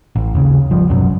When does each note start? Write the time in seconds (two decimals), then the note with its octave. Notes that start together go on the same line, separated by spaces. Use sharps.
0.16 A1
0.35 D#2 C#3
0.70 G#1 F3 G3
0.89 C#2 F#2 B2 F#3